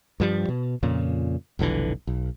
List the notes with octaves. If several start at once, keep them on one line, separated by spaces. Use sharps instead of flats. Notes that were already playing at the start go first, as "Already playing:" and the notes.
G2 F3 G3
B2
F2 A#2 C#3
F1 B1 D3 E3
B1